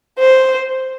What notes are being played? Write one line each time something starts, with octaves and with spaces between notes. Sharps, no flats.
C5